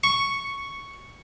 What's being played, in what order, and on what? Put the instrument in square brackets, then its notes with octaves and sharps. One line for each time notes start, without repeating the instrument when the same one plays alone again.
[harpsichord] C#6